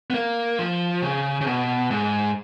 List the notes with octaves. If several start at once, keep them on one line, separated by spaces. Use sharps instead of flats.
B3
A#3
F3
C#3
C#3
B2
G#2